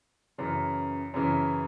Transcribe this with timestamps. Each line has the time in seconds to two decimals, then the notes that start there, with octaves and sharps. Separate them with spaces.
0.38 F#2 C#3 E3
1.14 F#2 C#3 E3